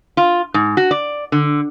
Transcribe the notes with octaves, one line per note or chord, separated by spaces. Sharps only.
F4
G#2
F#4
D5
D3